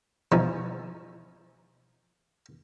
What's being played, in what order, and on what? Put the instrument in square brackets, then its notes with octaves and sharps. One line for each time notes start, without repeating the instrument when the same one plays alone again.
[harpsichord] B2 E3 F3 D#4